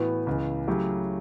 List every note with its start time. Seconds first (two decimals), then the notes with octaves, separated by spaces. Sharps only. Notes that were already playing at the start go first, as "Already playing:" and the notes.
Already playing: A2 E3 B3 F#4 B4
0.27 C#2 C#3 E3
0.68 C#3 F#3 A3 E4 G4